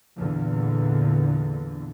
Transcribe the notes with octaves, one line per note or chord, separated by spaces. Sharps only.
E2 A#2 D3